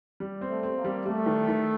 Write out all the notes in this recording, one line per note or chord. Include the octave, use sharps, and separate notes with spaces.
G3
C4
A3
C4
A#3
G3
G3 A3
D#3
D#3